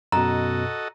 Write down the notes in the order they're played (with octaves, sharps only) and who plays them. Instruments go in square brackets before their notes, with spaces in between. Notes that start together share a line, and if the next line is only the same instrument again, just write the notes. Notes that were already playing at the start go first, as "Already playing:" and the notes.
[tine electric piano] F#2 B2 [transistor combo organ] F#4 A4 D#5 [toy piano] A#5